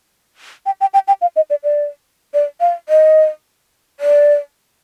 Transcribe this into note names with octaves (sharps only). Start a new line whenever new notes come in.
G5
G5
G5
G5
F5
D#5
D5
D5
D5
F5
D#5
D5